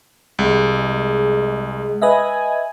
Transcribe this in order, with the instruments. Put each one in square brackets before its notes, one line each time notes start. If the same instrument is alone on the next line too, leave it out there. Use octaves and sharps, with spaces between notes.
[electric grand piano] C2 [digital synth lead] G#3
[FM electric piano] B4 D#5 E5 [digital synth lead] G#5